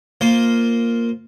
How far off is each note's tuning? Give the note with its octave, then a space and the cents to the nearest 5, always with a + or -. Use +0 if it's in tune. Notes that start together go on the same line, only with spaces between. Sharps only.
A#3 +0 F4 +0 C5 +0